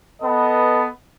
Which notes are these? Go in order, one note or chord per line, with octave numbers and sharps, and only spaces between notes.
B3 A4 B4 D#5